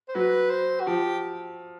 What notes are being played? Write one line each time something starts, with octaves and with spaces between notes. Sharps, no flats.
C5
F#3 B4
C5
F#4
F3 G4